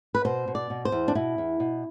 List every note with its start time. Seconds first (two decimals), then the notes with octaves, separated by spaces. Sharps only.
0.15 B4
0.25 B2 C5
0.48 B2
0.55 D5
0.70 B2
0.85 C5
0.92 E2
1.08 D4
1.15 B2 E4
1.38 E2
1.60 B2